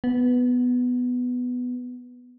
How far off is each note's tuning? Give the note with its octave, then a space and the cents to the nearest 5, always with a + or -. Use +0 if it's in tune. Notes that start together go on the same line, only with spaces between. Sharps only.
B3 +5